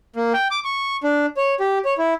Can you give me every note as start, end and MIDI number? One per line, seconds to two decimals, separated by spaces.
0.16 0.33 58
0.33 0.48 79
0.51 0.60 86
0.64 0.97 85
1.04 1.26 62
1.37 1.54 73
1.60 1.79 67
1.85 1.94 73
1.98 2.14 64